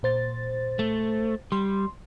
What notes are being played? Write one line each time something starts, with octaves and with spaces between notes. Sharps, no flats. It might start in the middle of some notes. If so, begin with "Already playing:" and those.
A#2 C5 A6
A3
G3 C6